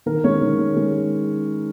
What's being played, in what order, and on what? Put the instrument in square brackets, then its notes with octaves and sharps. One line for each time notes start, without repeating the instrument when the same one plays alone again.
[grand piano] D#3 A#4
G#3 C#4 C#5
D#3
G#3
G#3